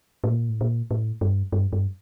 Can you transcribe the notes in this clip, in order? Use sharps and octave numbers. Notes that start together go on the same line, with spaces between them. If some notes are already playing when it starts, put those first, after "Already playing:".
A2
A#2
A2
A#2
A2
G2
G2
G2